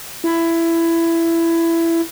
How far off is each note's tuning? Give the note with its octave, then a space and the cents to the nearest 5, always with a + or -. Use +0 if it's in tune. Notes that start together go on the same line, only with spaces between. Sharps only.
E4 +15